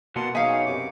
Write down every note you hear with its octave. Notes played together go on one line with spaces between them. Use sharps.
B2 A#3 F#4 F#5 A5 C6
F#3 D#4 G#4 C#5 E5 F5 G#5
F#2 C3 D6